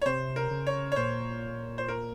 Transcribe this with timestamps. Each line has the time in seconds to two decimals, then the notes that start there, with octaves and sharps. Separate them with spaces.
0.02 C#5
0.06 C3 C5
0.36 A#4
0.51 C#3
0.67 C#5
0.92 C#5
0.96 A#2 C5
1.78 C5
1.88 A#4